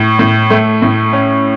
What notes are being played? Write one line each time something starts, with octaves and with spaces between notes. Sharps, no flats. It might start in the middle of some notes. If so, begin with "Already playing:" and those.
Already playing: A2
A2
A3
A2
C#4